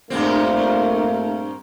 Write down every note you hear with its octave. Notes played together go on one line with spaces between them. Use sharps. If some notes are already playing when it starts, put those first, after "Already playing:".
G2 A#2 A3 A#3 C4 F4